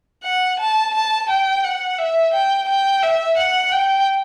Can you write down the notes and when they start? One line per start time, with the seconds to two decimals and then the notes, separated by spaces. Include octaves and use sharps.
0.24 F#5
0.60 A5
0.94 A5
1.29 G5
1.64 F#5
1.98 E5
2.33 G5
2.68 G5
3.02 E5
3.37 F#5
3.72 G5